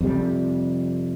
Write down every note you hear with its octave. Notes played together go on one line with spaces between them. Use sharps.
F2 C3 G3